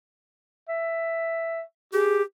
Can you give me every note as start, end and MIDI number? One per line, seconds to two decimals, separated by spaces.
0.69 1.62 76
1.93 2.23 67
1.93 2.22 68